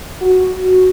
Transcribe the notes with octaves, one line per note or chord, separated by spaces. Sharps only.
F#4